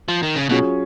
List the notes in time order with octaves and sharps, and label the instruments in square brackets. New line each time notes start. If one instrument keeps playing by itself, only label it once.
[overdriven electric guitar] F3
D#3
C#3
[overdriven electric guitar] B2 [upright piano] F#3 C#4 F4 G#4